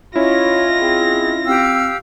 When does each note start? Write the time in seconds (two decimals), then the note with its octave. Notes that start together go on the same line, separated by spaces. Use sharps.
0.16 C#4 E4 F4 C#5 D#5 A#6
0.80 C4 G#4
1.45 C4 G4 F5 E6